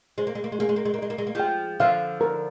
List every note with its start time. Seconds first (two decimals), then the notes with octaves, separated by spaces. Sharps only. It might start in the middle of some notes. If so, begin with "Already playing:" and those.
0.18 G#3 C5
0.27 A#3
0.35 G#3
0.44 A#3
0.52 G#3
0.59 A#3 G#4
0.69 G#3
0.76 A#3
0.85 G#3
0.94 A#3
0.99 G#3 D#5
1.10 A#3
1.18 G#3
1.27 A#3
1.35 F3 G#3 G5
1.80 D3 F3 F5
2.21 A#4